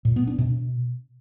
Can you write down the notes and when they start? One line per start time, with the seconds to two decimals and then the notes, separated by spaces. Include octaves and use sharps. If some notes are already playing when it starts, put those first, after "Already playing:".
0.05 A#2
0.16 B3
0.27 D4
0.39 B2